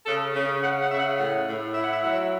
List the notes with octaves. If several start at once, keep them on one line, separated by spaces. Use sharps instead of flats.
C#3 A4
C#3
C#3 F#5
F#5
C#3 E5
F#5
A2 F#5
A2
E4 E5
F#5
E5
F#3 F#5
E5